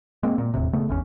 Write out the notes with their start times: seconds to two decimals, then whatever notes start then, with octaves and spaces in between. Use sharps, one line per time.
0.23 G#3 A#3 C4
0.38 A#2
0.54 E1 D#2 A2 C3
0.73 C#3 A3 B3
0.89 G#1 E2 C#4